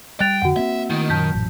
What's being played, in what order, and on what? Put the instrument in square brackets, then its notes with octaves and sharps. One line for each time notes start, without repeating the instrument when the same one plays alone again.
[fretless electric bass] G3 [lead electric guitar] G5 [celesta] F#6 A6 F7
[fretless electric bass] F2 D3 [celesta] F#4 F#5
[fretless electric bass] A#3 C4 [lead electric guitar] E5
[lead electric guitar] D#3 [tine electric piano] A3 E4
[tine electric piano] F#2 A#2 F#3 [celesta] A5 G6 B6
[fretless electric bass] A1